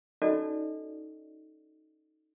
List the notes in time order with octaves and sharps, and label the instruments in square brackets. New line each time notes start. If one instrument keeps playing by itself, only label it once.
[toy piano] C#4 D#4 F#4 A4 D5 D#5